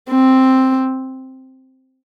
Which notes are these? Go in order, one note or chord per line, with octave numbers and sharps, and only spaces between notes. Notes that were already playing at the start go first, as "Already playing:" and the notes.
C4